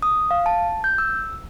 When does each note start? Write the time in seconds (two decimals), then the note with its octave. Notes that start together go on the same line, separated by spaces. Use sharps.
0.03 D#6
0.31 F5
0.46 A5
0.84 G6
0.98 E6